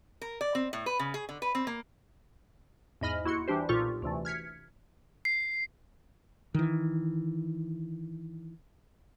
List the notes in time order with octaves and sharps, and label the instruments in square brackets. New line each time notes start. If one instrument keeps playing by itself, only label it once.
[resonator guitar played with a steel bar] A#4
D5
C4
A2
B4
C#3
G#4
D3
B4
C4
A#3
[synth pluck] E2 G#2 D#5 B5 F6 A#6
D#2 E4 F#4 C6 C#7
E3 G3 D4 G4 C5
B1 A#2 F4 G4 A4 C#6
D2 C3 E3 A3
F6 G#6 B6 C#7
[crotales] C7
[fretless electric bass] D#3 E3